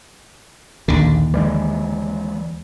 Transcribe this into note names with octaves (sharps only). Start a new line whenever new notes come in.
A#1 D#2 D3
E3 G3 G#3